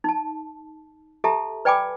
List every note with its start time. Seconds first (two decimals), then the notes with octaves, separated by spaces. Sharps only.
0.04 D#4 A5
1.24 G4 A4 E5 A5 A#5
1.65 B4 D5 G5 G#5 B5 D6